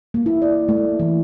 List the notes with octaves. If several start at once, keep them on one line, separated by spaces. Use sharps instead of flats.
A#3
E4
D5
A3
E3